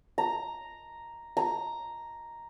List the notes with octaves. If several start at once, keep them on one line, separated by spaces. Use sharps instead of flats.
A#5
A#5